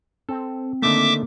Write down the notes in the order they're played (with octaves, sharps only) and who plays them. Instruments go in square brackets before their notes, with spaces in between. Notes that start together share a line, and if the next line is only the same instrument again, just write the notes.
[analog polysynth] C4 [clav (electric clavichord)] A4
[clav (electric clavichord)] D3 D#3 A3 [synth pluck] A#3 [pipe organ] E5 D6